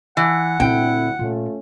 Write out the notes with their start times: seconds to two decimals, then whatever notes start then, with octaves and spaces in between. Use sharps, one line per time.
0.17 E3 F#5
0.60 D2 A#2 D3 C4 E4 G5
1.19 A#2 A3 C#4 F4